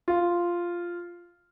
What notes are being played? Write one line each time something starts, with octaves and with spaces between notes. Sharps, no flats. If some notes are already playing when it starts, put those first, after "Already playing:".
F4